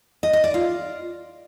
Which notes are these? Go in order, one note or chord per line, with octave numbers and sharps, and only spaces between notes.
D#5
D#5
D5
F4